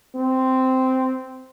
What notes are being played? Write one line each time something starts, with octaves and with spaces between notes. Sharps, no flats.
C4